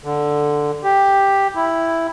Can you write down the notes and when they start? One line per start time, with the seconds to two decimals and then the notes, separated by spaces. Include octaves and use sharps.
0.04 D3
0.84 G4
1.55 E4